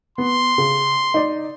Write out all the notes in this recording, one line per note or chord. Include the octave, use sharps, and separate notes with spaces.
B3 C6
C#3
D#4 D5